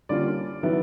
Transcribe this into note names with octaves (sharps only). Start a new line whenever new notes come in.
D3 G3 A#3 C#4 F4 D5
D#3 F#3 B3 E4